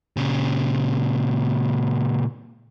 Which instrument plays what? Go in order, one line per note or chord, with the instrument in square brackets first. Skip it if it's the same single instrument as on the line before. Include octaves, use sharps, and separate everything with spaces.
[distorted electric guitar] A#2 C#3